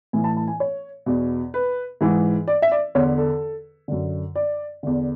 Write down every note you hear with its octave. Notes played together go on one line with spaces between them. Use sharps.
A2 E3 G#5
A5
A5
G#5
C#5
E2 B2
B4
G#2 E3
D5
E5
D5
E2 D3 C#5
A4
F#2 D3
D5
E2 D3